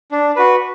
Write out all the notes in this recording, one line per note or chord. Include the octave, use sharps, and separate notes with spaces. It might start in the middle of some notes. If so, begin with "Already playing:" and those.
D4
F#4 B4